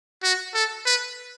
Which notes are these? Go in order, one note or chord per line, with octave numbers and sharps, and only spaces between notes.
F#4
A4
B4